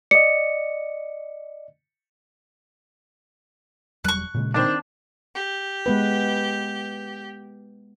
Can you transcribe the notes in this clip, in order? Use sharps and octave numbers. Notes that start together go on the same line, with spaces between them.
D5 D#5 C#7
E1 F#3 G3 C#6 F#6
A#2 C#3 G#3
D#3 C4 D4 C5
G4
G#3 B3 B4